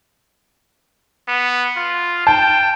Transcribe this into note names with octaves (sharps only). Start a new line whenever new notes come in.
B3
F4
G5 A5